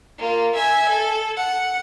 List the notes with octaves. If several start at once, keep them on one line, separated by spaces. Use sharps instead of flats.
A#3 F4
E5 G#5
A4
F#5